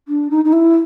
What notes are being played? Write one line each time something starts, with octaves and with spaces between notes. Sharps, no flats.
D4
D#4
D#4
E4